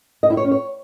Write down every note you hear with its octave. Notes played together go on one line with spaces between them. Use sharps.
D#5
E4
C#5
C#4
C#5